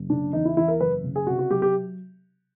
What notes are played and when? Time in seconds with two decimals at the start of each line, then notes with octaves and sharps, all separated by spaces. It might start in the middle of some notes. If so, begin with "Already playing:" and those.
Already playing: F#1
0.10 C#3 D4
0.33 E2 D#4
0.45 E4
0.57 E3 E4
0.68 A#4
0.80 F#1 B4
1.04 C#3
1.16 G#4
1.27 C3 F#4
1.39 F#4
1.51 F#3 G4
1.62 G4